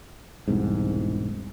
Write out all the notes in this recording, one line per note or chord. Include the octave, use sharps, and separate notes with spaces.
E1 C2 G#2